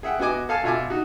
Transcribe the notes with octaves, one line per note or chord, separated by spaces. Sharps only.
G#4 E5 F#5 G5
B3 F#4 D#5 G#5 D6
A4 F5 G#5 A5
B2 F4 E5 G#5 A5 D6
D#4 F#4